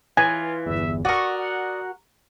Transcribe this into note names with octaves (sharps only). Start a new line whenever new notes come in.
E3 F4 G#5
G1 E2 E5
F#4 A#4 D5 C#6 D#6
F#5